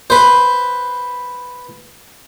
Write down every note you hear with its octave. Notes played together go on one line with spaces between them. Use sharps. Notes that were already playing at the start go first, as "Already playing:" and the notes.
B4 C5